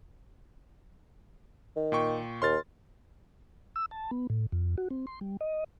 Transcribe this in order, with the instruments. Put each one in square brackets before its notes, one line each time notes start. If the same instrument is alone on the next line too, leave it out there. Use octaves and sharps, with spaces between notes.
[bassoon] D#3
[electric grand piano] A#2 G5 C#6
[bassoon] D#2 [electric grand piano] C6 F6 A6
[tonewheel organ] E6
A5
B3
A2
F2
F#4
C4
C6
G3
D#5